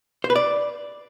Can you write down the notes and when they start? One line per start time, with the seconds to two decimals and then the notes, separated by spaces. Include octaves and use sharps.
0.24 C5
0.30 B4
0.36 D5